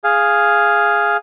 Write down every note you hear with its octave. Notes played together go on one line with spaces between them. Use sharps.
G#4 F5